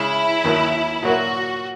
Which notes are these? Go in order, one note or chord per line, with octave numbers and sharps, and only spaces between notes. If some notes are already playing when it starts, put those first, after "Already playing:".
Already playing: C#3 G#3 C#4 E4
D#2 D#3 F#3
A#2 F#3 A#3 F#4